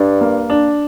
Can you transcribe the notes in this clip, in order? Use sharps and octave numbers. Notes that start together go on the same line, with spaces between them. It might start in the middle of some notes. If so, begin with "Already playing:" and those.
Already playing: G2 D4
A#3
D4